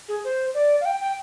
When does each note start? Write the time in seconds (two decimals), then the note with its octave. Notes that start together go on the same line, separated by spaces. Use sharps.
0.09 G#4
0.25 C5
0.54 D5
0.81 F5
0.85 G5
1.00 G5